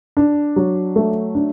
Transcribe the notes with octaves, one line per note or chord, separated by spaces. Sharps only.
D4
F#3
A3
D4